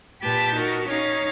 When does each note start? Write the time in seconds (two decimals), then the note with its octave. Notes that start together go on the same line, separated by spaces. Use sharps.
0.22 A#2 G4 B4 A5 G6
0.55 D#4 F#4 A#4
0.88 C#4 D#4 C#5 F5